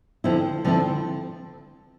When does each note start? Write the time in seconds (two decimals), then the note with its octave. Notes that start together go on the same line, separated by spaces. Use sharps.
0.24 D3 F3 C4 E4
0.65 D3 F3 C4 E4